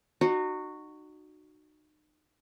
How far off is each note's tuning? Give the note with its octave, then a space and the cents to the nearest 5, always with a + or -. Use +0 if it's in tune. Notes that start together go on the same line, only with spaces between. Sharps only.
D#4 -35 F#4 +0